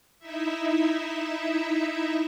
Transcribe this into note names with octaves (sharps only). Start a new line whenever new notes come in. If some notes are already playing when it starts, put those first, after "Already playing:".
D#4 E4 E5